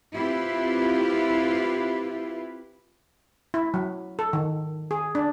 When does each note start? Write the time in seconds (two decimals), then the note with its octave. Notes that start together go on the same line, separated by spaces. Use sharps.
0.14 C4 E4 F4 G4 B4
3.54 E4
3.74 F#3
4.19 A4
4.33 D#3
4.91 G#4
5.15 D4